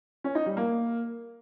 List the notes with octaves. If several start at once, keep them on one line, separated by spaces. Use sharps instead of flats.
C#4
D#4
G3
A#3